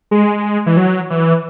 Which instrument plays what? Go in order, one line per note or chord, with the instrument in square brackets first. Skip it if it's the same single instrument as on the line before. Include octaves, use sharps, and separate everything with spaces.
[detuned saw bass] G#3
E3
F#3
E3